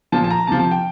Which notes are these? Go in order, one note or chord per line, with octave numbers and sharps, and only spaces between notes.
A#2 F3 A5
A5
A#5
C3 F3 A5
A5
G5